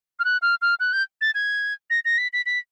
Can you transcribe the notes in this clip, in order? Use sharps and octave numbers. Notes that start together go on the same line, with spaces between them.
F6
F#6
F6
F6
F#6
G6
A6
G#6
A#6
A#6
B6
B6
B6